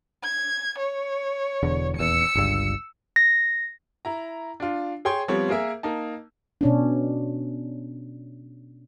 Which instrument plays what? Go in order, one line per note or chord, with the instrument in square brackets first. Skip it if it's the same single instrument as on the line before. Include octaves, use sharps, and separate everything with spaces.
[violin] G#6
C#5
[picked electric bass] E1 E2 D3
[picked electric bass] D#1 E2 [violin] E6 C#7
[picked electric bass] G1 C#2 G2
[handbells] A#6
[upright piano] E4 A#5
D4 F4
G#4 C#5 G5 C6 G#6
F3 G3 B3 C4 C#5
A#3 G#4 A#4 E5
A#3 D#4 A5
[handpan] B2 C#4 D4